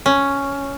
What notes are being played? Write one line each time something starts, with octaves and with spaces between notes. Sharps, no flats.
C#4